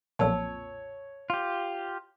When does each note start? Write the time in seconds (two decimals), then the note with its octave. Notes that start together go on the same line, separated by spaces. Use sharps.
0.19 B1 F2 A#2 C#5 A5 E6
1.30 F4 G4